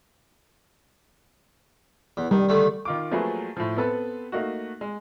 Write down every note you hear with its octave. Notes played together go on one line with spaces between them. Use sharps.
E2
D#3 G3
D3 D#3 A3
D#3 F4 D6
F3 F#3 A3 A#3 G#4 B4
A2 F3
B3 C4 A4 B4
A3 A#3 D#4 F#4
G#3